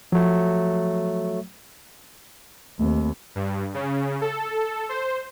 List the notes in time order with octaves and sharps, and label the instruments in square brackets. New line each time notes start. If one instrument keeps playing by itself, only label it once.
[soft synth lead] F3 [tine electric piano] F#3 A3
[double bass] D#2 [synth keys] A3 A#3 C4
[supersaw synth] G2
C#3
A4
C5